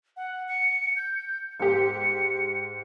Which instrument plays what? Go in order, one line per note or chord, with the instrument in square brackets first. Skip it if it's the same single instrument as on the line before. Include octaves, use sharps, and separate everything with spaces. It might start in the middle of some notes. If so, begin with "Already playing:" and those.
[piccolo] F#5
C#7
G6
[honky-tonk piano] G#2 G4 [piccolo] C#7